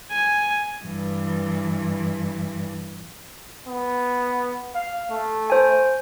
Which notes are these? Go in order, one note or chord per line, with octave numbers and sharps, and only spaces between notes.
G#5
G2 E3
B3
F5
A3
C5 G#5